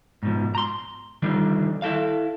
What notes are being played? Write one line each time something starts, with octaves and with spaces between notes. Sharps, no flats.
G#2 B2 F3
A#5 C6
D3 D#3 F3 G3 D4
E4 A4 F5